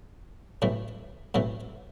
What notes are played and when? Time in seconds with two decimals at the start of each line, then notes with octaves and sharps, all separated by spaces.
0.62 B1 A2 E3
1.34 B1 A2 E3